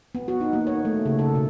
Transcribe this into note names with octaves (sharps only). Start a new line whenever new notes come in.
B3
F#4
D#4
A#3
C#5
A3
C#3
A4
B2